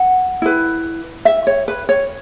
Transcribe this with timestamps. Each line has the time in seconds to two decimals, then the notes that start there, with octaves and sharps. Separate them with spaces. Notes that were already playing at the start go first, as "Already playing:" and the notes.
Already playing: F#5
0.42 E4 B4
1.25 E5
1.47 C#5
1.68 B4
1.89 C#5